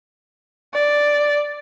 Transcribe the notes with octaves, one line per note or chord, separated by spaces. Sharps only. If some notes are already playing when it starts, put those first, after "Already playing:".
D5